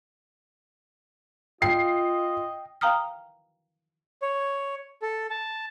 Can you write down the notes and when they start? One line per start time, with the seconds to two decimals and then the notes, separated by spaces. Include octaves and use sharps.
1.62 F4 D#5 G5 C7
2.81 F5 G5 A#5 D#6 F6
4.22 C#5
5.02 A4
5.30 A5